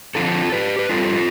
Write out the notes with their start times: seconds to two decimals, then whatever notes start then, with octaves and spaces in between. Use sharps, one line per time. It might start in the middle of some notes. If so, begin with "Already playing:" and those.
0.15 D3 F3 C4 F4 A4
0.52 G4 B4
0.79 B4
0.89 A2 G3 C4 F4 A4